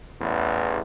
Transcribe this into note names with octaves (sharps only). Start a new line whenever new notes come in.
A1 E2